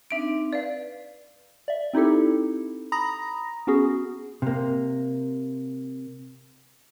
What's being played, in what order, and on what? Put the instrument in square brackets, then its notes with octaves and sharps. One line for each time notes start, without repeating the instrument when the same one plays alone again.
[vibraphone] C4 D4 D#4 [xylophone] E5 D7
[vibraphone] B4 [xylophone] D5 F5
[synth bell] D5 E5
C4 D#4 E4 G4 A4
A#5 B5 D#6 A#6
B3 C#4 F#4 G#4
[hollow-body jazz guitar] C3 A#3